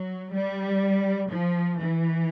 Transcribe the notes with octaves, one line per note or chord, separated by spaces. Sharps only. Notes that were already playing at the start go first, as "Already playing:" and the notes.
Already playing: F#3
G3
F3
E3